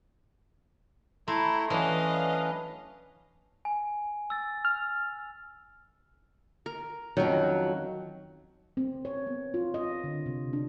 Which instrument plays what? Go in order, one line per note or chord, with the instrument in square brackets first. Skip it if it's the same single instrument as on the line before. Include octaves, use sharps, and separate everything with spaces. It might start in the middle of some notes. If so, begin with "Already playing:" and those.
[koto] A3 [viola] E4 [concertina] A#5 C6
[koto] E3 F#3 [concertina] C#4 D4 B4 [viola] D#5 F5
[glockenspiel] G#5
E6 A6
[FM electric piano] F6
[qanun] A#4
[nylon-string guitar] F2 F#3 [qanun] D#3 C#4 A#4
[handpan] C4
C#5
B3
F4
D#5
D3
C3
D4